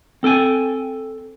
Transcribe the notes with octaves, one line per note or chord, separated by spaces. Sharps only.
C4 A4 G5 G#5